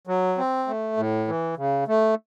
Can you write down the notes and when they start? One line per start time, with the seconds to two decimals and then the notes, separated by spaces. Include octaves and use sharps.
0.07 F#3
0.38 C4
0.67 A3
0.97 A2
1.28 E3
1.57 C#3
1.88 A3